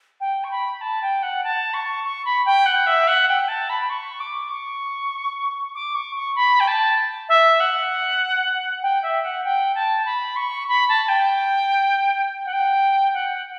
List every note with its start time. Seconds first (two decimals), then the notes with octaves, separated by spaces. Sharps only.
0.20 G5
0.44 C#6
0.51 B5
0.81 A5
1.02 G5
1.23 F#5
1.44 A5
1.74 C#6
2.04 C#6
2.25 B5
2.46 G5
2.66 F#5
2.87 E5
3.08 F#5
3.29 G5
3.48 A5
3.70 B5
3.90 C#6
4.20 D6
4.51 C#6
5.75 D6
5.95 C#6
6.16 C#6
6.36 B5
6.60 G5
6.68 A5
7.29 E5
7.60 F#5
8.83 G5
9.03 E5
9.23 F#5
9.44 G5
9.75 A5
10.05 B5
10.36 C#6
10.68 B5
10.89 A5
11.09 G5
12.46 F#5
12.53 G5
13.14 F#5